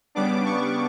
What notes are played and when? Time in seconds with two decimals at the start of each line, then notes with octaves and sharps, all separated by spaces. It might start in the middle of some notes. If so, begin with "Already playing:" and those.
0.15 C#3 G3 B3 D4 D6
0.46 C#6